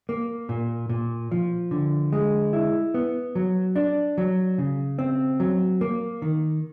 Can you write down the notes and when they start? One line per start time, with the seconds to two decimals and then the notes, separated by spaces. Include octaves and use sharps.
0.09 A#3
0.49 A#2
0.89 A#2
1.31 F3
1.71 D3
2.13 G#3
2.53 E4
2.94 B3
3.35 F#3
3.76 D4
4.18 F#3
4.58 C#3
4.99 C4
5.40 F#3
5.81 A#3
6.22 D#3